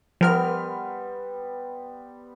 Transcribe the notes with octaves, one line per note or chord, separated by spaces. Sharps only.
F3 G3 B3 A#4 C5 F6